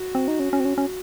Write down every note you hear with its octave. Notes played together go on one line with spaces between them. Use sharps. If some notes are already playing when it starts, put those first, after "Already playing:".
Already playing: F#4
C4
D#4
C#4
C#4
C4
C#4
C#4